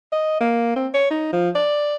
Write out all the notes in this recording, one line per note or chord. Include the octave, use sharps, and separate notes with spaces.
D#5
A#3
C4
C#5
D#4
F3
D5